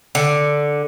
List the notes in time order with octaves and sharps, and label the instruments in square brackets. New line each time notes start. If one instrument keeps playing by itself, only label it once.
[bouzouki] D3